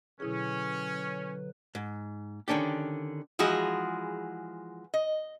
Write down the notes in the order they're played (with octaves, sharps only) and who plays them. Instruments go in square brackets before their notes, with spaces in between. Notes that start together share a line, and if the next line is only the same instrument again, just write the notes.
[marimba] B2 E4 G#4 [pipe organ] D3 F#3 B4 [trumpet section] C#4
[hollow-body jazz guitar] G#2
D3 D#3 C#4 D4 G4
[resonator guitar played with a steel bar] E3 F3 G#3 F#4 G#4
D#5